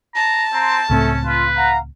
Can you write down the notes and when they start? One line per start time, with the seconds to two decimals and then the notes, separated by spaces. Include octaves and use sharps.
0.15 A5 A#5
0.53 C4 A#5 C6
0.90 C#2 A2 A3 C4 C#4 A4
1.25 F4 B4
1.57 F5 F#5 A#5